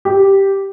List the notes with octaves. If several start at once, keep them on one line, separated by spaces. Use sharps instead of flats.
G4